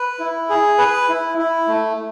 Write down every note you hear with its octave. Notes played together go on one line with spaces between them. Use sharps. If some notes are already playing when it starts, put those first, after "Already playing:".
Already playing: B4
E4
G#4
B4
E4
E4
A3